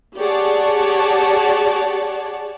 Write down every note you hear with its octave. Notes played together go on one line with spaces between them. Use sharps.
G4 G#4 C#5 D5 F#5 A5